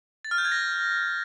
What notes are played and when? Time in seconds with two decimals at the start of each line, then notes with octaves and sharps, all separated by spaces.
0.25 A6
0.31 F6
0.38 G6
0.45 G#6
0.52 A#6